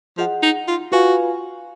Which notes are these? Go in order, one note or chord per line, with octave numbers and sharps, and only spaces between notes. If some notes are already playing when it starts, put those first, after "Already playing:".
F3 G#4 D#5 F#5
D#4
F4
F4 F#4 B4 F5 G#5